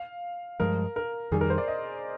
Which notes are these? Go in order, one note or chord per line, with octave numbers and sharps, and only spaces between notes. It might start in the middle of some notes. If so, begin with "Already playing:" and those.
Already playing: F5
G2 F3 G#3 A#4
A#4
F2 D#3 G3 G#4
A#4
C5
D5
D#5